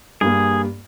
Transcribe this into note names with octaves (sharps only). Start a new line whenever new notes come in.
G2 A#3 G#4